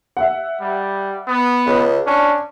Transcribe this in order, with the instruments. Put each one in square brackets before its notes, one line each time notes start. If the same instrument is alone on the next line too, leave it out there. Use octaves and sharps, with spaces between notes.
[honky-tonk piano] E5 F#5
[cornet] G3
B3
[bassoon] C#2
[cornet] C#4 [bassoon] D4